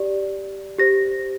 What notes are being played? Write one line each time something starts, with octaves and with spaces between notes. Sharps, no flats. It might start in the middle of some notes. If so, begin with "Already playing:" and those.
Already playing: G4 D5
G4 C5 A#6